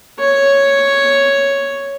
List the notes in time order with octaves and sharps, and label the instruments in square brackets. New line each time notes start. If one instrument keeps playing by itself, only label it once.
[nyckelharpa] C#5